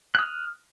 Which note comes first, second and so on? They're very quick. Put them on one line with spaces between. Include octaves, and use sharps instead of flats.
F#6 D#6 F6